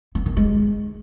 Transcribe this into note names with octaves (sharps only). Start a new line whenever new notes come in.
B3
D#3
G#3